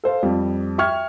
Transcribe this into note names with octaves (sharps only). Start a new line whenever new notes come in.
A4 C5 F5
F2 F3 G3
E5 G5 C#6 F6 G#6